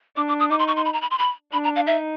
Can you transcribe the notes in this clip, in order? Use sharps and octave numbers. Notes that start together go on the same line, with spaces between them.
D4 D6
D6
D#6
D#4 D6
C6
C#6
C6
B5
A#5
B5
C6
B5
D4 B5
A#5
F5
D#4 E5